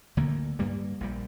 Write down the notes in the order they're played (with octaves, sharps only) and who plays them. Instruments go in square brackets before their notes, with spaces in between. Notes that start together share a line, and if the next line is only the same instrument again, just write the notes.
[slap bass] D2 D3 A#3
G2 G3 A#3
A#1 A#2 G3